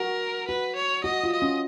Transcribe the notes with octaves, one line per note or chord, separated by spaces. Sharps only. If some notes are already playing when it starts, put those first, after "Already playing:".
Already playing: F#4 A#4
F#4 B4
C#5
F#4 D#5
F4
D#5
C#4